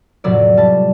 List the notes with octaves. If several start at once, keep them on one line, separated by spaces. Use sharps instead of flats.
F2 A2 C3 F#3 D5
G3 A5